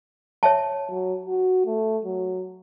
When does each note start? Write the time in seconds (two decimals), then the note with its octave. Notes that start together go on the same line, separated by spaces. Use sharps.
0.43 C#5 E5 A5
0.90 F#3
1.26 F#4
1.66 A3
2.05 F#3